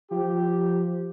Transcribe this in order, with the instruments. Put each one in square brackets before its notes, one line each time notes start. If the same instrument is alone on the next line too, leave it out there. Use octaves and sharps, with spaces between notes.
[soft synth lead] F3 [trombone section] G4